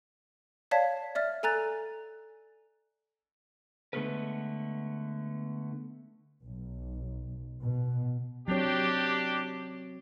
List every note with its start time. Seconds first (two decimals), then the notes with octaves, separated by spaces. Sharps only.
0.71 C#5 D5 F5 A5 G#6 B6
1.15 D5 E5 F6 A6
1.43 A4 G#5 A#5 F#6 A6
3.93 D3 G#3 A3 B3 A#4 B4
6.44 B1
7.63 B2
8.48 F#3 C4 D4 G4 C#5